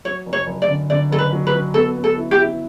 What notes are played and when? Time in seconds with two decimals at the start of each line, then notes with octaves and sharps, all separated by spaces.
0.05 F#3 C#5
0.26 F#1
0.33 C#5
0.46 F#1
0.62 D5
0.68 D3
0.90 D3 D5
1.11 F#1 A4
1.18 B4
1.32 F#3
1.47 B4
1.54 F#3
1.74 B3 A4
1.96 B3
2.04 A4
2.17 E4
2.31 G4
2.38 E4